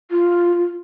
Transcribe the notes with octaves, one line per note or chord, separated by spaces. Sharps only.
F4